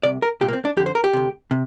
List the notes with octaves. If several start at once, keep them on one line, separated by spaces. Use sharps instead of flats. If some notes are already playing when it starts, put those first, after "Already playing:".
C2 C3 D5
A#4
C2 A#2 G4
A#3
C4
D4
F2 D3 G4
C5
A#4
G4
D2 C3
C3